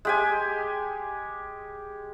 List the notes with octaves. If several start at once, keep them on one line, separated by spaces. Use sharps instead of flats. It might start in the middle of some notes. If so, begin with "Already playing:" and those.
G#3 G4 G#5